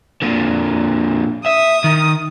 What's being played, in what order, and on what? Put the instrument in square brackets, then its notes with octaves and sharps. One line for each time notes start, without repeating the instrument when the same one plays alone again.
[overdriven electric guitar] A#2 D3
[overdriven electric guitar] E5 [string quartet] D#6
[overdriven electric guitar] D#3